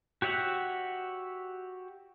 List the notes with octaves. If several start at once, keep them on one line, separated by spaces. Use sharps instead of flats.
F#4 G4 C#5 E5 F#5